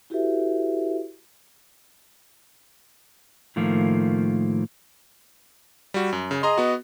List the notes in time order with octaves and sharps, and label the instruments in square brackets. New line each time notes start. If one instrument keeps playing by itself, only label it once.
[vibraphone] E4 F#4 G4 A4 B4 E5
[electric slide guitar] A2 D#3 F3 A3 A#3
[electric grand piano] G3 F#4
F#2
C#3
[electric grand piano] G#4 A#5 C6 [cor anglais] D#5
[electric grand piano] B3 F#4